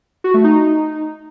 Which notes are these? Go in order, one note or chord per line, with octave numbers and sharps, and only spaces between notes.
F#4
A3
D#4